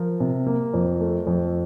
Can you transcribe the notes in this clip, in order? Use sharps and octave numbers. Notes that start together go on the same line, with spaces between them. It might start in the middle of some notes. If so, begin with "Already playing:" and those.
Already playing: F3 A#4
C3
A#3
F2
A3
F2